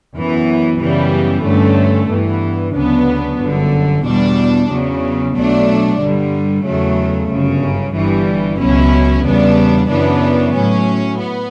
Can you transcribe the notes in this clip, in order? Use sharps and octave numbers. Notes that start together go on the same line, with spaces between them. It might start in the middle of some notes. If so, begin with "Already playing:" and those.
F#2 E3 B3
F#2 C#3 E3 G3 B3
G2 D3 A3 C#4
G2 E3 B3
D2 C#3 F#3 B3 D4
G1 F#2 D3
E2 B2 G3 D4
E2 C#3 F#3
B1 B2 F#3 A3 D4
G2 D3 G3
E2 C#3 F#3 A3
G1 F#2 C#3
G1 G2 E3 G3
C#2 B2 F#3 C#4 E4
E2 C#3 G3 B3 D4
F#2 C#3 E3 B3 D4
A2 F#3 C#4
B3